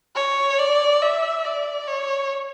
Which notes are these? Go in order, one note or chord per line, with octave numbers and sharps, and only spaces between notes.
C#5
D5
E5
D5
C#5